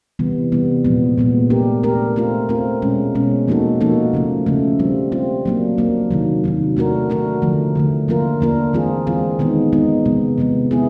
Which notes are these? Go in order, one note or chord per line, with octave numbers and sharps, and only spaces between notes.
C3 E3 G3 B3
C3 E3 G3 B3
A#2 F3 G#3 B3
A#2 F3 G#3 B3
A3 D4 G4 A#4
A3 D4 G4 A#4
A3 C4 F4 A#4
A3 C4 F4 A#4
B2 G#3 C#4
B2 G#3 C#4
F3 A#3 D#4 F#4 A4
F3 A#3 D#4 F#4 A4
C#3 F3 A3
C#3 F3 A3
G3 C4 F4
G3 C4 F4
F#3 A#3 D4
F#3 A#3 D4
C3 D#3 F#3
C3 D#3 F#3
A3 D4 F#4 A#4
A3 D4 F#4 A#4
D3 F3 A3
D3 F3 A3
F3 A#3 D4 F4 A#4
F3 A#3 D4 F4 A#4
E3 G#3 C4 F4 G#4
E3 G#3 C4 F4 G#4
D#3 G#3 B3 D#4
D#3 G#3 B3 D#4
C3 F3 G#3 B3
C3 F3 G#3 B3
B3 E4 G#4